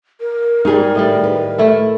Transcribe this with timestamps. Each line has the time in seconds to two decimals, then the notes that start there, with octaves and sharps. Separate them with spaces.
0.21 A#4
0.65 G#2 G3 D#4 G#4 A#4
0.95 A2 D#3 G3
1.24 B4
1.58 A3 E4 A4